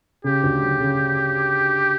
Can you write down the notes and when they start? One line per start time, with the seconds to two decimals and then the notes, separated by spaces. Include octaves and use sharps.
0.24 C#3 G4
0.43 D2
0.62 F#3
0.80 C#3